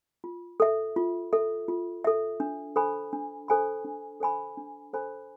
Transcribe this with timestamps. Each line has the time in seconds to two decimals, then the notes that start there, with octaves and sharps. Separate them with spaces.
0.24 F4
0.60 A4 E5
0.96 F4
1.33 A4 E5
1.68 F4
2.04 A4 E5
2.40 D4
2.76 A4 C5 G#5 B5
3.13 D4
3.48 A4 C5 G#5 B5
3.84 D4
4.20 A4 C5 G#5 B5
4.57 D4
4.93 A4 C5 G#5 B5